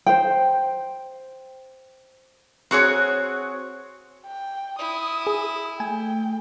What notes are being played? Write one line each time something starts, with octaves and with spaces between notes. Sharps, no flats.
C5 G5
C4 F#4 G#4 C#5
G5
E4 D#6
G#4
A3 G5 G#5